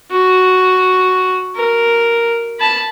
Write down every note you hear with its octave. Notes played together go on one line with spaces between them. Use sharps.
F#4
A#4
A5 B5